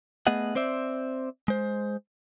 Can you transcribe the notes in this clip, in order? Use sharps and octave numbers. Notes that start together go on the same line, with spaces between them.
A3 B3 G#4 D#5 F#5
C4 C5 D5 E5
G#3 C5